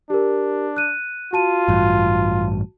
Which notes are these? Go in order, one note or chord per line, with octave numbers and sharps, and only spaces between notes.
D4 G4 A#4
F#6 D#7
F4 F#4 A5 D#7
A1 G2